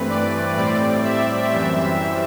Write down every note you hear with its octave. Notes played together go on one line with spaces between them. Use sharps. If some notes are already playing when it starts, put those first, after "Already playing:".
Already playing: G2 E3 A3 C4 B4
D5
A2 G3 C4 D5
E5
F#2 E3 G3 C4 E5